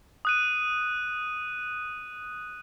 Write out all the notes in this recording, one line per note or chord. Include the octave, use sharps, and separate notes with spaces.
D#6 F#6 D#7